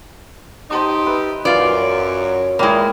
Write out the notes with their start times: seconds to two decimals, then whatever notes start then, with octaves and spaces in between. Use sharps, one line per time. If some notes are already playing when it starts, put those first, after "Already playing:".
0.71 D#4 G4 C5 A5 D#6
1.06 B4 E5
1.45 F#2 E3 F4 D5
1.83 F#3
2.59 A#2 G#3 A#3 E4 G5 B5